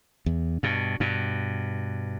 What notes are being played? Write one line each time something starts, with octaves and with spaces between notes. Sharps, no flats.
E2
G2 B2
G2 B2